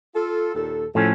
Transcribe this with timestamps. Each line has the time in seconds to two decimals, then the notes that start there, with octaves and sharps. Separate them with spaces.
0.15 F4 A4
0.55 D#2 A#2 A4
0.95 A2 F3 C#4 A4